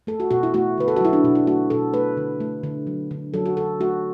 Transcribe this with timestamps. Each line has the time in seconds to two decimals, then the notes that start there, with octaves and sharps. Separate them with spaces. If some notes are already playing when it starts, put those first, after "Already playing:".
0.07 A3 A4
0.20 F#4
0.31 B2 F#4
0.43 E4
0.54 A3 F#4
0.78 D3 B4
0.88 A4
0.96 F#4
1.00 F#3 E4
1.13 D4
1.24 B2 D4
1.35 E4
1.47 A3 F#4
1.70 B2 A4
1.94 A3 B4
2.17 D3
2.40 A3
2.63 D3
2.87 F#3
3.11 D3
3.34 F#3 A4
3.46 F#4
3.57 D3 A4
3.80 A3 F#4